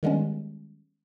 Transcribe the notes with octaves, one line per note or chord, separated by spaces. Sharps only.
D#3 G3 G#3 B3 C#4